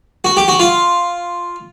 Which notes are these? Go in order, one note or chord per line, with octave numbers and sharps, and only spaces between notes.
F#4
G4
F#4
F4